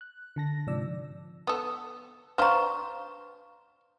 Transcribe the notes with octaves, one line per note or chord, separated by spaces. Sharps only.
F#6
D3 A5 A#6
G#2 C3 F3 D5 E6
B3 A4 D#6
D4 B4 C5 F5 A#5 C6 C#6